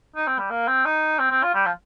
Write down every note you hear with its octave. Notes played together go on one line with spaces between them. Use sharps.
D#4
C4
G3
A#3
C4
D#4
C4
C4
F4
G3
F3